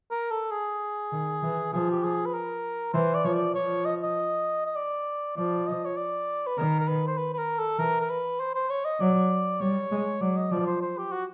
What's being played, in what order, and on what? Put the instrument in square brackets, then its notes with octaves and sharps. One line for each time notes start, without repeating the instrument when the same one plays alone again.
[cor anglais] A#4
A4
G#4
[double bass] D#3
E3
[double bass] F3 [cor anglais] G#4
[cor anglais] G4
G#4
B4
A#4
[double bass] E3 [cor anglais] C5
[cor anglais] D5
[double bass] F3 [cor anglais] C#5
[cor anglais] D5
[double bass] F3 [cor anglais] C#5
[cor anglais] D#5
D#5
D#5
D5
[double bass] F3 [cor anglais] D5
[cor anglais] D#5
C#5
D5
B4
[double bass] D#3 [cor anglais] A#4
[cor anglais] A#4
B4
C5
B4
B4
A#4
A4
[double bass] E3 [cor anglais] A#4
[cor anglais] A#4
B4
C5
C5
C#5
D#5
[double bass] F#3 [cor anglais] D5
[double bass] G3 [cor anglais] C#5
[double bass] G#3
[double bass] F#3 [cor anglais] D5
[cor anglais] D#5
[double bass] F3 [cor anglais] D5
[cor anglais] C5
C5
G4
F#4